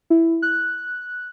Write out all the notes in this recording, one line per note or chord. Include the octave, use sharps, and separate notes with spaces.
E4
F#6